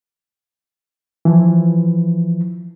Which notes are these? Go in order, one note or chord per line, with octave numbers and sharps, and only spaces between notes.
E3 F3